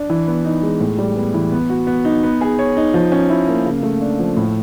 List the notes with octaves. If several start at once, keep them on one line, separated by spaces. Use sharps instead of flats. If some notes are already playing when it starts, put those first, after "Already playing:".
Already playing: D4
E3
B3
D#4
G#3
A2
G3
B3
E3
B3
F#4
B3
D#4
B3
G#4
C#5
D#4
F3
C#4
E4
A#3
C#3
A3
D4
F3
A2